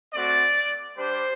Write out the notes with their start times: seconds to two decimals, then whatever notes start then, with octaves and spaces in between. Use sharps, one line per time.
0.14 A3 C4 F#4 D5
0.97 G3 D4 G4 C5